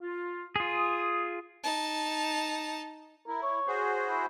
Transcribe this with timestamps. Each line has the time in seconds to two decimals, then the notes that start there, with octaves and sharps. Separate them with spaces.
0.01 F4
0.56 F4 G#4 D#6
1.64 D#4 A5
3.27 E4 A#4
3.43 C#5
3.68 F#4 G#4 C5
4.08 E4